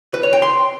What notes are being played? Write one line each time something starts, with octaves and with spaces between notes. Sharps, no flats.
B4
C#5
G5
C6